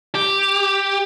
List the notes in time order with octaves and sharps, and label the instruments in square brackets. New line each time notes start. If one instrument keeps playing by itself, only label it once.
[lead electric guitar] G4